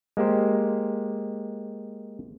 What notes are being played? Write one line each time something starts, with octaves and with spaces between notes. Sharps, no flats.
G#3 A#3 G4 C5